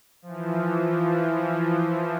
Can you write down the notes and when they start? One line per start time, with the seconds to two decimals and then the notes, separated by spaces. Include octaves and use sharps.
0.22 E3 F3